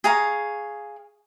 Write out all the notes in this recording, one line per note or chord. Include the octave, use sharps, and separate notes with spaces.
G#4 F5 A#5 C#6